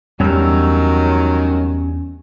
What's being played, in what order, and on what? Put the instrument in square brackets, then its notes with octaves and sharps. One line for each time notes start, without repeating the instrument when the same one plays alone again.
[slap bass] E2 [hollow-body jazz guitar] G2 G3 [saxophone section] D#3 F#3 [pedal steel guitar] C#4 C#5 E6